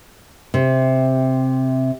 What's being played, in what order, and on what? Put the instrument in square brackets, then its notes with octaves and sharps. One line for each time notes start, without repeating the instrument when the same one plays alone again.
[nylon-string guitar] C3